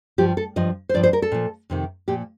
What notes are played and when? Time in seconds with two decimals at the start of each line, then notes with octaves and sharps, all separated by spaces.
0.18 G2 F3 G4
0.37 A4
0.56 G2 F3 D#5
0.89 C5
0.94 G2 F3 D5
1.03 C5
1.13 A#4
1.22 A4
1.32 A#2 F3
1.70 F2 C3 D#3
2.08 A#2 F3 G4